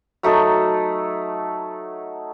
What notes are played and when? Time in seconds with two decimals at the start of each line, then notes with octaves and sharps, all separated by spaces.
0.23 F#3 A3 D#4 A4